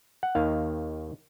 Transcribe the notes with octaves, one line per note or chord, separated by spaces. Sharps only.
F#5
D#2 D#3 F5